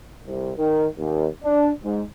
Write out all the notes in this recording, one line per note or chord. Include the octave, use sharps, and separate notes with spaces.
C2
D#3
D#2
D4
G#2